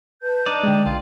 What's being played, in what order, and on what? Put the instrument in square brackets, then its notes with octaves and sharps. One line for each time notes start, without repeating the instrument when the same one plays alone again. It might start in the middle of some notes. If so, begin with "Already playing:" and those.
[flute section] B4 A5 G6
[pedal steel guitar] D4 D#4 D5
[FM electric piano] D3 G#3 [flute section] G5
[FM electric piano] B1 [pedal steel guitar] F4